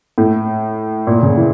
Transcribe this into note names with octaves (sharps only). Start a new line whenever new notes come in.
A2
A#2
C#3
E3